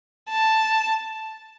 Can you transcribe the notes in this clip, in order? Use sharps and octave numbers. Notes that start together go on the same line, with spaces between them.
A5